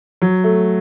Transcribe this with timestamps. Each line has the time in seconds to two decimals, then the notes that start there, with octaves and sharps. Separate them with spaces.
0.22 F#3
0.44 A3